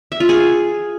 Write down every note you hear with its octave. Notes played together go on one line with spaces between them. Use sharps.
E5
F4
G#4